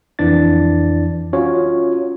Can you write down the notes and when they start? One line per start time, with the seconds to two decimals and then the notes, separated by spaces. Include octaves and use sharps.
0.19 F2 E3 D4 D5 A6
1.33 C#4 F4 F#4 C#5